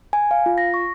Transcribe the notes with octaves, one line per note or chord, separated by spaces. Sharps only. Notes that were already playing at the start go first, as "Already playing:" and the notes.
G#5
F5
F4
A#6
C#6